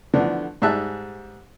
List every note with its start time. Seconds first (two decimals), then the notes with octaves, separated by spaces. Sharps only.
0.14 D3 E3 F3 A3 B3 D4
0.62 G#2 G3 G#4 E5 A5 F#6